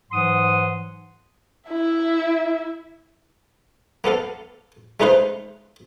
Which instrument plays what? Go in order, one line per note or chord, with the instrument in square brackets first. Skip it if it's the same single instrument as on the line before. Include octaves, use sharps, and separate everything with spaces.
[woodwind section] G#2 E3 F#3 F#5 C6 D#6
[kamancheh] E4 E5
[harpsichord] A#3 B3 A4 F5
G#3 A3 D#4 B4 C5 F5